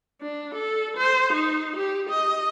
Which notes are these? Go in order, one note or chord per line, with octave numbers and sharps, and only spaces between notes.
D4
A4
C5
D#4
G4
D#5